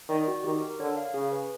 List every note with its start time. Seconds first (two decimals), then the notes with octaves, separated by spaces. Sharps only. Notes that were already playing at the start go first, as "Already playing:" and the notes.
0.09 D#3 D5
0.28 F#4
0.44 D#3 G4
0.62 A#4
0.80 D3 C#5
0.97 F5
1.14 C#3 G#4
1.32 B4